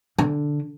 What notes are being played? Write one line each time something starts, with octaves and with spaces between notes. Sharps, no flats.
D3